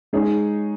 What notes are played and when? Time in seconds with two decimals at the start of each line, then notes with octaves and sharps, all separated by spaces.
0.13 G#3 D#4 G#4 C#5